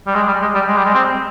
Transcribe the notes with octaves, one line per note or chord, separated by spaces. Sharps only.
G3
G#3
G3
G#3
G3
G#3
G3
G#3
C4